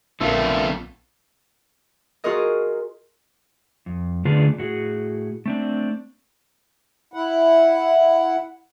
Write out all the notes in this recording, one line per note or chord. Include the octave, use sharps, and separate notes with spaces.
A#1 F2 D3 A3 B3 F4 A#4 E6
F4 F#4 G#4 A#4 C#5 D#5
F2
D3 A3 D4 F4 G#4 B4
A2 F#4 G#4
A3 C4 D4
E4 F#5